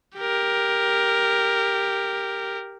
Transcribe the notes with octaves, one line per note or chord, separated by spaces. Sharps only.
G4 A#4